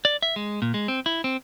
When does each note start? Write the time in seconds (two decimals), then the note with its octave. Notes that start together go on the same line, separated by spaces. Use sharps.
0.05 D5
0.22 E5
0.36 G#3
0.62 A#2
0.74 G#3
0.88 C4
1.06 E4
1.24 C4